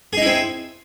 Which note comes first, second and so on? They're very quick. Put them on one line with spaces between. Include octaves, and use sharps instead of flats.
G#4 D#4 E4 C4